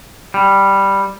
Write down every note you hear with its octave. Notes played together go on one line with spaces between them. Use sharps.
G3